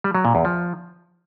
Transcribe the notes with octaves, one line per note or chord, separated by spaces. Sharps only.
G3
F#3
A#2
E2
F3